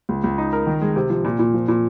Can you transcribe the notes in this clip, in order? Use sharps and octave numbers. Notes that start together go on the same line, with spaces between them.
C#2
C#2
D#4
A#4
D#3
G#3
C3
F3
A#2
A#2
F3
A#2